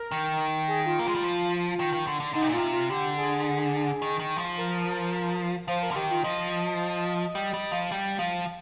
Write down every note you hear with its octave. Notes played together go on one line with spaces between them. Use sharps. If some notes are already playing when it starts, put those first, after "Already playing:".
Already playing: A#4
D#3
G#4
F4
A#3
G#3 F4
G3
F3
D#3
D#3
D3
D3
D3 D#4
C3
A#2
C3 F4
F4
D3 G4
G#4
D#3
D#3
F3
A#4
F3 C5
A#4
D3
D#3 G4
F4
F3 D#5
G3
G3
F3
G3
F3